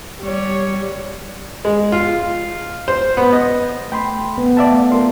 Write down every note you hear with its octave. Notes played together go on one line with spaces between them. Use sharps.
G3 C#5
G#3
F4
C5
B3
D#5
A3 G5 B5 C6
B3
D5 E5 F5 A5
A3
F4 A#4 C6